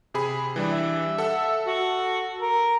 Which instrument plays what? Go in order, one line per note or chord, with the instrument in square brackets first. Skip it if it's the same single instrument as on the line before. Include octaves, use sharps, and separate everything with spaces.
[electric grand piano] C3 G#4 B5
E3 G3 D4
[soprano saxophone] E5
[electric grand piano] A4 F#5 E6
[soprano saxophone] F#4
A#4